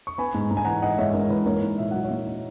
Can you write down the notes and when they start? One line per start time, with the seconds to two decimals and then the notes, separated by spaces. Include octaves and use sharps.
0.07 C#6
0.18 B3 G#5 B5
0.34 G#2
0.50 G#2 A#5
0.57 G#5
0.64 E3 F#5 A#5
0.82 B3 D#5 F#5
0.98 G#2 C#5 E5
1.14 G#2 A#4 C#5
1.30 E3 B4
1.46 A#3 A#4 C#5
1.62 D#4
1.78 A#2 E5
1.91 F#3 F#5
2.04 C#5 E5
2.10 A#3
2.26 D#4